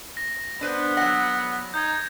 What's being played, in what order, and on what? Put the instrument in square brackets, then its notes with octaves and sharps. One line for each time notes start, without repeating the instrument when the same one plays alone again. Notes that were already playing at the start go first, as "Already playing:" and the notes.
[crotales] A#6
[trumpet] B3 [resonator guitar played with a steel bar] D4 B4 C5
[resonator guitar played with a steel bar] F#3 F#5 [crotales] A#6
[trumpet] D#4 [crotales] G6 G#6